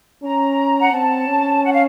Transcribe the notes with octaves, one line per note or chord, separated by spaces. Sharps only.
C#4 A#5
F#5
C4 A5
C#4
F#5
F5